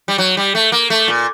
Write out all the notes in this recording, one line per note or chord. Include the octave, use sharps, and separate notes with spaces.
G3
F#3
G3
A3
A#3
A3
A#2